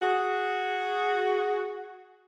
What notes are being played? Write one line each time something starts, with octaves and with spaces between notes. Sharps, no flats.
F#4 G#4